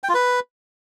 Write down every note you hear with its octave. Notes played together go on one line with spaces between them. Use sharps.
G5
F4
B4